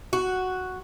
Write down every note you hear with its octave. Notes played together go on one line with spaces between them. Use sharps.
F#4